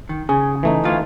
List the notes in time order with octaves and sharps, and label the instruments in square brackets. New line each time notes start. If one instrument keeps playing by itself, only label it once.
[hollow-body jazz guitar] D#3
[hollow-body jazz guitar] C#3 [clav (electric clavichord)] G#4
[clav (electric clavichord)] E3 A3 D#4
[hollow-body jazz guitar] D2 A2 F4